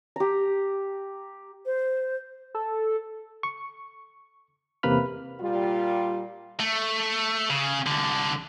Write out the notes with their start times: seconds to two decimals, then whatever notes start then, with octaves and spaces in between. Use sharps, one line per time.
0.16 G4 A#5
1.66 C5
2.55 A4
3.43 C#6
4.83 E2 C3 A#3 B4 B5 F6
5.40 A#2 G3 F4
6.60 A3
7.50 C#3
7.86 C2 D3